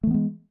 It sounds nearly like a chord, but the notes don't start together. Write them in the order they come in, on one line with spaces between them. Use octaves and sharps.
A3 E3 B3 G#3